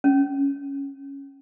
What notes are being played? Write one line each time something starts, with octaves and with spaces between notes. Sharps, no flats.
C#4